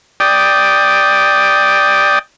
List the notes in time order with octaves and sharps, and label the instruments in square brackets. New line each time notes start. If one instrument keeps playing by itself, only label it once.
[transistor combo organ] D5 G5 D#6